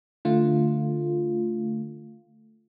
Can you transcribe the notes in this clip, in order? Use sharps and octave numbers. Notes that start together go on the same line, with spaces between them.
D3 A3 F4